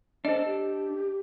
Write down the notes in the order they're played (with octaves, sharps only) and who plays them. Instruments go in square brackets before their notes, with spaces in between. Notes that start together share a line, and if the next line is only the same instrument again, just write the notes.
[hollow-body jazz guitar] D4 A4 [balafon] C5 D#5
[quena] G4